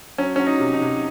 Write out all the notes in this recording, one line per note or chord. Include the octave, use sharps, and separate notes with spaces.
F#3 C#4
F#3 C#4
D#4
C3
D#4
C3